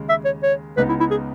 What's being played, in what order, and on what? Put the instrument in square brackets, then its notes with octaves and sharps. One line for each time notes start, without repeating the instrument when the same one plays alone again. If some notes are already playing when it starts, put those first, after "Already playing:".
Already playing: [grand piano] D#2 C#3 G#3
[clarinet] E5
C#5
C#5
[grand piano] C#2 C#3 G#3 B3 D#4 [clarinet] B4
[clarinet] E4
E4
G#4